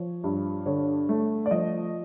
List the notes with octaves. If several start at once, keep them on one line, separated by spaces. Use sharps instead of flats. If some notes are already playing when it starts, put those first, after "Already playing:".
Already playing: F3 C#5
G2
D3 C#5
A3
D5
F3 D#5